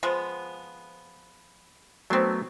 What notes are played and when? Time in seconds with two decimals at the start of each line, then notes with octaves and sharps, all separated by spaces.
0.03 F3 G#3 B3
2.10 F#3 A3 B3 C4 D4